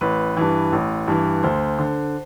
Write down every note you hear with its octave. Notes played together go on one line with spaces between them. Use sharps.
A1 B4
G2 E3
A1
G2 E3
D2 C5
D3